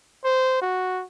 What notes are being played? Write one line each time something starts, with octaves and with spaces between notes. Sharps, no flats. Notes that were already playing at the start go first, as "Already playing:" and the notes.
C5
F#4